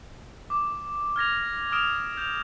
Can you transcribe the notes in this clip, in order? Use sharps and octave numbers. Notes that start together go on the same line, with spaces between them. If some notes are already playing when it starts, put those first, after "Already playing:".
D6
F6 G#6 A#6 F7
D#6 F6 D7 E7 F7
G6 F7